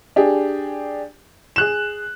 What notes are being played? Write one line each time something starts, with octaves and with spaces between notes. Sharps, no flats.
D4 G4 G#4
G#4 F#6 E7